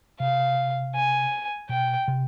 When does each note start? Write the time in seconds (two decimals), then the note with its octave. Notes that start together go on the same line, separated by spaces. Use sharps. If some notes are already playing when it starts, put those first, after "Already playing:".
0.20 C3 F5
0.95 G#5
1.69 B2 G5
2.08 C3